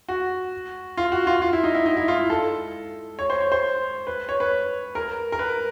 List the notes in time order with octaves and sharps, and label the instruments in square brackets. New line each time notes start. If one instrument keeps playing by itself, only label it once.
[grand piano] F#4
F4
F#4
F4
F4
E4
D#4
E4
D#4
E4
F4
E4
A4
C#5
C5
C#5
C5
B4
C#5
B4
A#4
A#4
B4